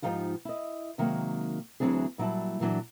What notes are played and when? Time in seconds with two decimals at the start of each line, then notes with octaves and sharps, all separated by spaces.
0.02 G#2 B2 F3 D#4 F4 G4
0.45 E4 D#5
0.98 C3 D#3 F#3 G#3 A#3
1.80 D2 E3 F#3 C4 D4 G#4
2.18 A#2 F#3 G3 E4 A5
2.60 A#2 E3 F#3 D4